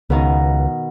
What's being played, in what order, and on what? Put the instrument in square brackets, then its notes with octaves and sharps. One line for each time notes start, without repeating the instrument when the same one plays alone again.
[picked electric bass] C#2 [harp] B2 D#3 D#4